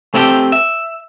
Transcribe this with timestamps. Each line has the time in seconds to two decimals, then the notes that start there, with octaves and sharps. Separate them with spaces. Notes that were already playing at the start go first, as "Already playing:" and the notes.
0.14 A3 C4 E4 G4 A4 G5
0.52 E5